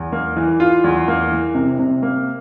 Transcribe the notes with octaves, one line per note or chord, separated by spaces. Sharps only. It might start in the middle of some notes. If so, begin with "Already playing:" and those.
Already playing: E2
A#3
E3
F4
E2
A#3
E3
C3
C3
A#3